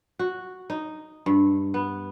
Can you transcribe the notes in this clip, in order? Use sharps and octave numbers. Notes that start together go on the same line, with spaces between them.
F#4
D#4
G2
B3